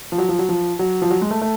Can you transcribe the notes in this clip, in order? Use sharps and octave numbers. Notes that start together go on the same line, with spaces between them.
F3
F#3
F3
F#3
F3
F#3
F3
F#3
G#3
A3
A3